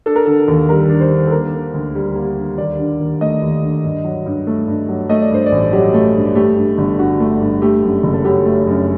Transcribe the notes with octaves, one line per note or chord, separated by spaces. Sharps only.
D4 A4
A#4
D3 A4
D#2
G3 A#4
D4
C5
D3
A4
A#3 A#4
D3
D2
G3
A#3
D3
D#2 D5
D3
D#2
A3 D#5
D#2
D3
G2
F#3
G2
A3
G2
F#3
A3 D#5
D5
G2 C5
D5
A1
F#3 G4
A3
G2
A3 G4
G2
G1
D3 F#4
A3
G2
A3 G4
F#2
F#1
A4
F#3 G4
A3
F#2